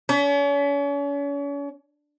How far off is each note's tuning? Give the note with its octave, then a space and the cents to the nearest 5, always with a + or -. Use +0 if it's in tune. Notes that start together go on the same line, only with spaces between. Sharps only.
C#4 +40